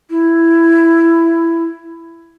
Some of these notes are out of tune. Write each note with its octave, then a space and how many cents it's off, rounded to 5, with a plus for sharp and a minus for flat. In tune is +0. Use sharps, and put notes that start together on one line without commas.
E4 +10